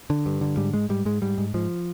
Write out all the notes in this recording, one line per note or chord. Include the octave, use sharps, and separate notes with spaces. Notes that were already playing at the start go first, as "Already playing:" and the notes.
D3
G2
D3
G#2 G3
G#2 G#3
G#2 G3
G#2 G#3
G#2 G3
G#2
G#2 F3